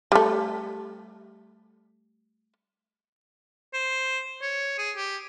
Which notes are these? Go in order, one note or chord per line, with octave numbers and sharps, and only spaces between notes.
G3 A3
C5
C#5
G#4
G4